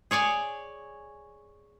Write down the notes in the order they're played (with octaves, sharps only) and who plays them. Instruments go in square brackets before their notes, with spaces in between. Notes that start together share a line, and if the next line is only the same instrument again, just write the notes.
[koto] G#4 C#5 D5 G#5